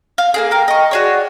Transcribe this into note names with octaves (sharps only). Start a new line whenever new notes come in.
F5
A#3 D4 G#4 A4
A#4 F5 G5
D#5 C#6
F#4 G#4 C#5 D5